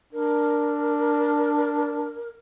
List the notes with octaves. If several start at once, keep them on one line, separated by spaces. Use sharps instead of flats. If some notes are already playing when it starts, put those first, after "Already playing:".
D4 A#4